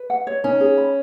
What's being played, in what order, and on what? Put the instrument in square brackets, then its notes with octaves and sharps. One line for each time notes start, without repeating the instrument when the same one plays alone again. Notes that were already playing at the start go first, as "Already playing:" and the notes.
Already playing: [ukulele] B4
F#5
C#5
[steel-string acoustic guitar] C#4 [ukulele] D#4
[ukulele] G#4
B5